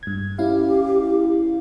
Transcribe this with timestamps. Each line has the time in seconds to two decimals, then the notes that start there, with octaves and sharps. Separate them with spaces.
0.03 G2 G#6
0.39 C#4 E4 G4 F5